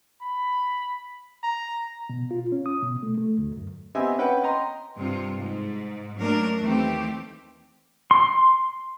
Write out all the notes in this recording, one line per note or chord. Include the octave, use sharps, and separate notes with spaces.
B5
A#5
B2
F4
C#4
D#6
B2
A3
A3
D2
F#2
B3 C4 G4 D#5 E5 G#5
C#4 B4 F#5 G5
D#5 G5 A#5 C6
G2 C3 F4
G#2
F#3 A3 A#3 C#4 D4 A#4
D#2 E3 A3 C4 G4
C6